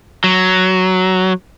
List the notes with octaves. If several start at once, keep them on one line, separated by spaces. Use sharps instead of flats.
F#3